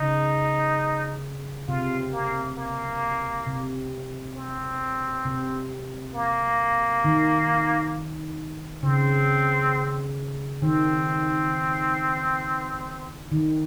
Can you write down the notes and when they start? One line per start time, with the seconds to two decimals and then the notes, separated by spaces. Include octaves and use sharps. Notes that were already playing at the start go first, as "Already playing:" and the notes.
Already playing: C#3 D#4
1.68 C3 F4
2.13 A#3
2.57 A#3
3.46 C3
4.36 C4
5.26 C3
6.15 A#3
7.05 D#3
8.83 C#3 C4
10.62 D#3 C4
13.32 D#3